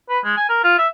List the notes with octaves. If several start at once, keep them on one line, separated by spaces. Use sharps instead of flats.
B4
G#3
G#5
A#4
F4
E5